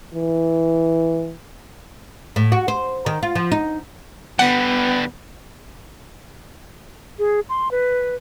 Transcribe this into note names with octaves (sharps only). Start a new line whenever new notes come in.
E3
A2
F#4
C5
D#3
F4
F3
D#4
D3 G3 B3 F#5
G#4
C6
B4